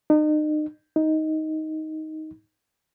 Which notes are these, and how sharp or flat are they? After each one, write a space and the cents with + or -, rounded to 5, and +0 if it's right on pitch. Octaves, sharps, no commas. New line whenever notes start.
D#4 -35
D#4 +10